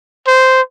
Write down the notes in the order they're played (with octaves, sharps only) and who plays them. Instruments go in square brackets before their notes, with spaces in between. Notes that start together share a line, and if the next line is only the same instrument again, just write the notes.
[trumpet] C5